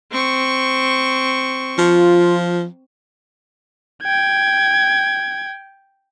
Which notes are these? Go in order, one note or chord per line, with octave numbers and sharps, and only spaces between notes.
C4 C#6
F3 F4
G5 G#6